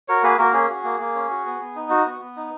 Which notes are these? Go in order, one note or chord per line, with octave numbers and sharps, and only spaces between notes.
F#4 A#4 C#5
A#3 G#4 B4
A#3 F#4 A#4
C#4 G#4
F#4
A#3
A#3
C#4
F#4
B3
B3
D#4
F#4
B3
B3
D#4